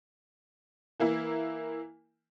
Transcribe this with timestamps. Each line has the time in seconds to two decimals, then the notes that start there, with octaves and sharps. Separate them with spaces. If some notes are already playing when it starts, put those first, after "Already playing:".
1.00 E3 A#3 E4